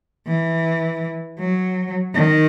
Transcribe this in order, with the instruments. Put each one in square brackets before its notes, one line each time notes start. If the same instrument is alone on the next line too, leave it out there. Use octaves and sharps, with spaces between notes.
[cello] E3
F#3
D#3